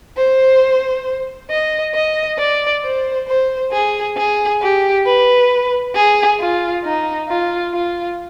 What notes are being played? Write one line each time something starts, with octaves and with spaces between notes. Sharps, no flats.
C5
D#5
D#5
D5
C5
C5
G#4
G#4
G4
B4
G#4
F4
D#4
F4
F4